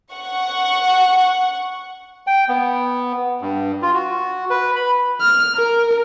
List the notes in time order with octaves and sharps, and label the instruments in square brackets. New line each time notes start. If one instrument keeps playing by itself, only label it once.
[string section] F#5 C#6
[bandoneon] G5
B3
G2
F4
F#4
B4
B5
[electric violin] F6
A#4